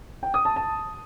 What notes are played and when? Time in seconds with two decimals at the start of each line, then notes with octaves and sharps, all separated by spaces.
0.23 G5
0.34 D#6
0.45 A5
0.56 A5